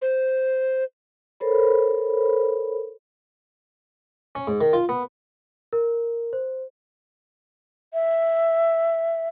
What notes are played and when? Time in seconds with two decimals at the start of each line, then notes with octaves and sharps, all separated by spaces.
0.02 C5
1.40 A4 A#4 C5 C#5 B5
4.35 C#4
4.48 G#2
4.61 D#3
4.73 F4
4.89 B3
5.73 A#4
6.33 C5
7.94 E5